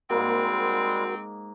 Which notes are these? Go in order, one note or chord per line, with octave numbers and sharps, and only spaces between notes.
G#2 G3 G#3 A#3 C4 F#4 A#4